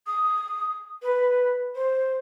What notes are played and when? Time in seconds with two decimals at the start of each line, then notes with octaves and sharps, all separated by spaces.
0.06 D#6
1.02 B4
1.75 C5